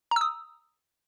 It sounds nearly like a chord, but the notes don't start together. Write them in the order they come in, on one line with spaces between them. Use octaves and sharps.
A#5 E6 D#6